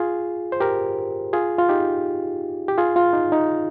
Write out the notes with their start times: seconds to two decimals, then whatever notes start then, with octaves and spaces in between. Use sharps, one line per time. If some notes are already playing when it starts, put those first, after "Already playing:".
Already playing: F4 G#4
0.52 C5
0.60 G4 A#4
1.33 F4 G#4
1.58 F4
1.69 D#4 G4
2.68 G4
2.78 F4 G#4
2.96 F4
3.13 D#4
3.32 D#4